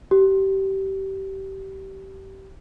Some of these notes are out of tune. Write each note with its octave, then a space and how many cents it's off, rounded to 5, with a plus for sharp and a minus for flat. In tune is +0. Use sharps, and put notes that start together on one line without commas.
G4 -25